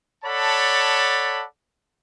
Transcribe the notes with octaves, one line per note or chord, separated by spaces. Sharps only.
A4 C#5 D5 F#5 A5 B5